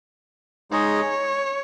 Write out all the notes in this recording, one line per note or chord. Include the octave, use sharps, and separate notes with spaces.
G#3 D#4 G#4 C#5 D#5